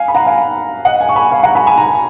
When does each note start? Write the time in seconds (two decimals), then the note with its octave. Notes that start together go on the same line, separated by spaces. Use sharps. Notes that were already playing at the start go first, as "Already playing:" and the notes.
Already playing: F5 G#5
0.08 B5
0.15 F#5 A#5
0.26 F5 G#5
0.85 D#5 F#5
1.00 F5 G#5
1.09 C#6
1.16 G#5 B5
1.31 F5 G#5
1.39 B5
1.43 F#5 A#5
1.55 G#5 B5
1.67 G#5 B5
1.78 A#5
1.89 G#5